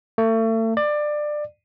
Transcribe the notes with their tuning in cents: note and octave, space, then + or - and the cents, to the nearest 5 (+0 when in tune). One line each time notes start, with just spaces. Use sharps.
A3 +35
D5 +20